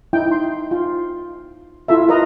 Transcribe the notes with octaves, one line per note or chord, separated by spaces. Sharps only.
D#4 E4 G5
C6
F4
E4 F4 A4 E5
F4 A#4 B4 D#5 A#5